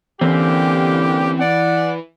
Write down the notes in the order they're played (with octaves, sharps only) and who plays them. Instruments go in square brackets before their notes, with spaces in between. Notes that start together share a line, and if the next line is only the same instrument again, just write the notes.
[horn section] D3 A#3 G4 [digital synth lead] E3 [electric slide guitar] C4 C#4
[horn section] D5 F#5